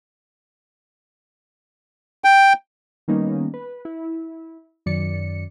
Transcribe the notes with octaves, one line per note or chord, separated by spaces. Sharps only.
G5
D#3 G3 A#3 B3 C#4 D#4
B4
E4
F#2 D#3 D5 C#7